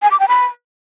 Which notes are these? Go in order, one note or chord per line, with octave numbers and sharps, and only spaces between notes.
G#5
D6
G5
B5